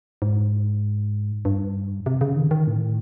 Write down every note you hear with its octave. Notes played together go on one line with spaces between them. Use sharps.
G#2
G2
C3
C#3
D#3
D#3
A2